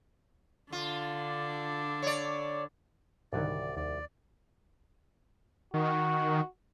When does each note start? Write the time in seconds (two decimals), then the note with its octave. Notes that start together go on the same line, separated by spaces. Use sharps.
0.72 D3 D4 F4
2.02 C#5 D5
3.33 C2 G#2 D3 D#3 F#4 C#5 D5
3.77 D#2 D5
5.74 D#3 F#4